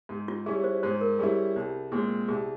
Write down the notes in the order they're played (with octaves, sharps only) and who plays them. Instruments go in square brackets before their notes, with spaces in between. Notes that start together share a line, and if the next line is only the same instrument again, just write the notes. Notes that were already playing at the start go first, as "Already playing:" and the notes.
[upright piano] G#2
[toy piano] F4
[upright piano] G3 C#4 E4 [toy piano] G#4
[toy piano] C5
[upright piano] G#2 [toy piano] C5
[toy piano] A#4
[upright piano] G3 C#4 E4 [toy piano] G#4
[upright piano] C2
[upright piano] A#2 G#3 C4 [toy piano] G#4
[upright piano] C2 [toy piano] G#4